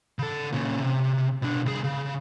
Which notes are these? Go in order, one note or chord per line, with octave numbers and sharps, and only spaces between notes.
C#3 A4
A#2 C#3
C3
B2 D4
C2 G#4
C#3